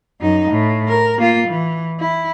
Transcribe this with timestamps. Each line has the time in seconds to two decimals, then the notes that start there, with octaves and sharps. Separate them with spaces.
0.21 F#2 D#4
0.50 A2
0.88 A#4
1.18 A#3 F4
1.48 E3
2.00 E4